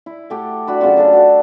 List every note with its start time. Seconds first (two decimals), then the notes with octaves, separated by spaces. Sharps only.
0.06 E4
0.30 A3 G4 F#5
0.67 D4 F#4 B5
0.81 C#3 F#3 F4 F#4
0.97 D4 A4 F5 G5
1.13 F#4 A4